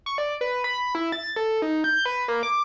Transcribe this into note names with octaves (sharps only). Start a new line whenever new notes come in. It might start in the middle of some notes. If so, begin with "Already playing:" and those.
C#6
D5
B4
B5
E4
A6
A4
D#4
G6
B4
A#3
D6